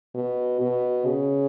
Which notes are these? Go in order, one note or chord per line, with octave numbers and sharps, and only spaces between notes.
B2
B2
C#3